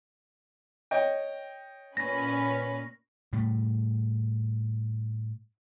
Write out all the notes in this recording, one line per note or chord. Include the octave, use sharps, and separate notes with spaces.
C#5 D#5 G5
A#2 C#4 B4 A#6
A2 G3